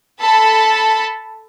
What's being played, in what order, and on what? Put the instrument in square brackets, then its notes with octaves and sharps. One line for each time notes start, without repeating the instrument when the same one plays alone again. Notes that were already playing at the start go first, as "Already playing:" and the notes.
[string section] A4 A5 B5